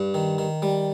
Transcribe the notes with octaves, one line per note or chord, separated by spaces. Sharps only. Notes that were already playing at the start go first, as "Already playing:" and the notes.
Already playing: G2
D#3
D#3
G3